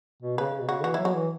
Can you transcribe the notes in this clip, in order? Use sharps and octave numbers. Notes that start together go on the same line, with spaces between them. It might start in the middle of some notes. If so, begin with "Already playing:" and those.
B2
C#3 B4
C#3
B2
C#3 F#4
E3 F#4
F#3 E4
F#4
E3